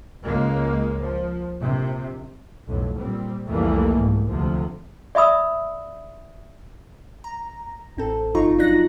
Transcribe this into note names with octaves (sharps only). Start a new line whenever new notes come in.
C#2 G#3 A#3
F3
A#1 C3
B1 F2 A2
A#2 G3 C4
C2 F2 E3 G3 A3 A#3
G#2
D2 C3 F3
D5 E5 B5 D#6 E6
A#5
A1 C4 A4
G1 F3 D#4 F4 A#5 C#6
F#3 D4 D#4 F#6 A#6